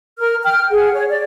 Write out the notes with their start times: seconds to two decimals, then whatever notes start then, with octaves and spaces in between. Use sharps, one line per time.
0.20 A#4 F6
0.43 G5 F6
0.71 G#4 F#5
0.94 C#5
1.09 D5